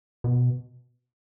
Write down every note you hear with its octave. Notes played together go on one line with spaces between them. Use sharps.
B2